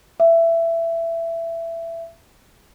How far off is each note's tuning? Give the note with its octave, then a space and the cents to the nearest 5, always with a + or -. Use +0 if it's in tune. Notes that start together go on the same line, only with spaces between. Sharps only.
E5 +20